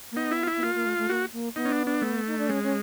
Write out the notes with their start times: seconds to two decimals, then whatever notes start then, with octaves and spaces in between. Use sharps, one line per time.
0.12 A#3
0.16 B3 D#4
0.31 E4
0.43 F4
0.47 E4
0.56 B3
0.63 A#3 F4
0.75 A#3
0.86 A3
0.98 A3
1.09 A#3 F#4
1.32 A#3
1.56 B3 D#4
1.65 C#4
1.71 D4
1.87 D4
2.02 A3
2.27 D#4
2.38 D4
2.48 G#3 C#4
2.63 C#4